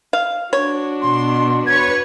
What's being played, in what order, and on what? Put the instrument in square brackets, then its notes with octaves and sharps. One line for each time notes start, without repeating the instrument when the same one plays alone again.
[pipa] F5
[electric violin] D4 F#4 [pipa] C#5
[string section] B2 [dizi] C6
[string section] B4 C#5 C#6 [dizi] G#6